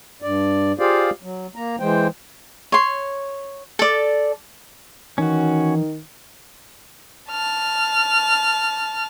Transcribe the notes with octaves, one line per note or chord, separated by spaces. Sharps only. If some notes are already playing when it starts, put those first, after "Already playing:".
G2 D5
F4 G4 G#4 C5 D5 F5
F#3
A#3 A#5
E3 G#3 C5 G5
C#5 C6
A4 D5
D#3 E3 C#4 F#4
A5 F6